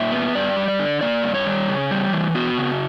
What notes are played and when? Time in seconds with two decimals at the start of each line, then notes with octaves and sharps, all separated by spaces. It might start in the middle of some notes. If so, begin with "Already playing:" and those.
Already playing: A#2 E5
0.12 B3
0.35 G2 D5
0.56 G3
0.68 D5
0.79 D3
1.01 A#3 D5
1.23 G2
1.34 C#5
1.47 G3
1.68 C#3
1.91 G3
2.13 E3
2.35 B3 F#4
2.58 C#3